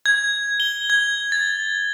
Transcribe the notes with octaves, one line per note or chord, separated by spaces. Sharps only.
G#6
G7
G#6
A6